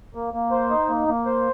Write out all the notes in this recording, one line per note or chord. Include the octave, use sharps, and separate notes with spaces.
A#3
A#3
C5
D#4
A#3
A#3
C5